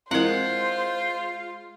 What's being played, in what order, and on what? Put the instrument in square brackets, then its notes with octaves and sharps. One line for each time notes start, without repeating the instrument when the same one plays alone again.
[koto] G#3 F#5 [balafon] C4 E4 A#4 [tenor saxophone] F4 [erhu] C5